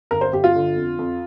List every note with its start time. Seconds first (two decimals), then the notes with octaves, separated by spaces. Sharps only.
0.11 G1 A#4
0.21 C5
0.32 G1 G4
0.44 F4
0.55 D3
0.76 F2
0.99 F2